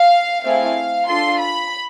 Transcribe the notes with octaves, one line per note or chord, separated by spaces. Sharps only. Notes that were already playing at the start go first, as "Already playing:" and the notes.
Already playing: F5
A3 C4 E4 G#4 F5
D4 F4 A4 C6
B5